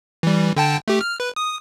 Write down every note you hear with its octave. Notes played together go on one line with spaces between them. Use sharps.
E3 G3
D3 G5 A5
A3 G4
F6
B4
D#6